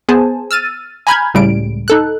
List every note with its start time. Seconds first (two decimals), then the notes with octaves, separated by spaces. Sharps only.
0.09 B3 G#4 C5 G#5 A5
0.51 E6 F6 A6 D#7
1.07 G#5 A#5 B5 F6 G6 G#6
1.34 C#2 A2 C#3 G3 D7
1.88 D#4 A4 F#6